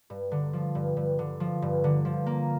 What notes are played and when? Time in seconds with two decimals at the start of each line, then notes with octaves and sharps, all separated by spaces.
0.10 G2
0.32 D3
0.53 F3
0.75 G2
0.97 G2
1.19 D3
1.40 F3
1.62 G2
1.84 D3
2.05 F3
2.26 A#3